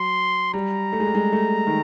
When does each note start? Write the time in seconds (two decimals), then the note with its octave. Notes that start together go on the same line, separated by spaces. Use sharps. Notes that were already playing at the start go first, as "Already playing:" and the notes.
Already playing: F#3 C6
0.53 G3 A#5
0.93 A3
1.00 G#3
1.07 G3
1.15 G#3
1.33 A3
1.67 D#3